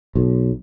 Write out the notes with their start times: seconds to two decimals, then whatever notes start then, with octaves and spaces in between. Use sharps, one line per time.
0.15 B1